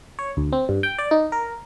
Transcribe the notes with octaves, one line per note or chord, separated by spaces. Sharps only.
C#5
D2
C4
G2
G5
D5
D#4
A#4